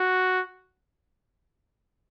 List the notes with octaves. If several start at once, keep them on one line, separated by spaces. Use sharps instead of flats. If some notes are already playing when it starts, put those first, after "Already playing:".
Already playing: F#4